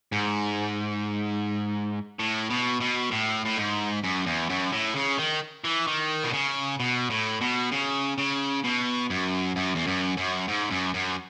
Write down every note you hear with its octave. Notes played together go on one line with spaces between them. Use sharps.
G#2
A2
B2
B2
A2
A2
G#2
F#2
E2
F#2
A2
C#3
D#3
E3
D#3
B2
C#3
B2
A2
B2
C#3
C#3
B2
F#2
F#2
E2
F#2
F#2
G#2
F#2
F#2